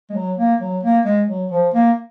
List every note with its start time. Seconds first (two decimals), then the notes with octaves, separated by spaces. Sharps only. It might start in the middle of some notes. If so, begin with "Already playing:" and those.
0.10 G#3
0.15 F#3
0.38 A#3
0.61 F#3
0.83 A#3
1.05 G#3
1.29 F#3
1.51 F3
1.74 A#3